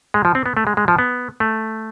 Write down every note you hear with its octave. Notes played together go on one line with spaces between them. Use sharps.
G#3
F3
C4
B3
A3
G#3
G#3
F3
B3
A3